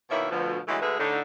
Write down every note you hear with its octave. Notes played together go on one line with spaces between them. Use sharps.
B2 D#3 A#3 E4 C#5 E5
D2 B2 F3
D3 E3 F#3 G#3 A3
D2 D3 G#3 G#4 B4 E5
A2 D3 D#4